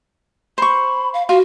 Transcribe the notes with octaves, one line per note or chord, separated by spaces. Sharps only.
C5 B5 C#6
F5
F4 F#4